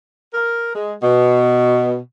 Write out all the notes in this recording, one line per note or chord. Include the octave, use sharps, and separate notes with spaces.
A#4
G#3
B2